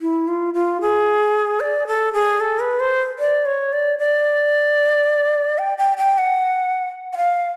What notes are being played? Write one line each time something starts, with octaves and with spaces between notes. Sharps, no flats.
E4
F4
F4
G#4
D5
A4
G#4
A4
B4
C5
D5
C#5
D5
D5
G5
G5
G5
F#5
F#5
F5